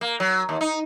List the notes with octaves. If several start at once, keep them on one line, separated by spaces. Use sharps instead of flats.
A#3
F#3
D#2
D#4